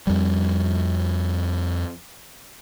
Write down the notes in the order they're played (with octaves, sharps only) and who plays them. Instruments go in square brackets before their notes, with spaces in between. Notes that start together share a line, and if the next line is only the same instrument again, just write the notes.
[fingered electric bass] F2 G3